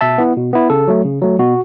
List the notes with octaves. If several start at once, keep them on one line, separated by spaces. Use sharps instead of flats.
B2 E5 A5
B3 E4
B2
B3 E4
C#3 A4
F#3 A3
C#3
F#3 A3
B2 F#4